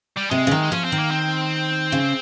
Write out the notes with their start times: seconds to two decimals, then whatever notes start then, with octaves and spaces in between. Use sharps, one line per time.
0.17 G3
0.31 C3 G#3
0.47 C#3
0.51 D#3
0.71 F3 C#4
0.84 C4
0.92 D#3
0.98 A#3
1.11 C4
1.92 C#3